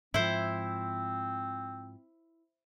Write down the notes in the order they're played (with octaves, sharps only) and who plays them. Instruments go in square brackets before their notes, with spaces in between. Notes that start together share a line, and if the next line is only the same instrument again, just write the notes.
[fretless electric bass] G#2 F3 [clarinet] C4 [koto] E4 C5